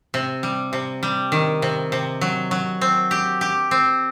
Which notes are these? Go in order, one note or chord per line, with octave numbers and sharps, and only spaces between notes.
C3
G3
C3
G3
D#3
C3
C3
F#3
F#3
C4
G4
G4
C4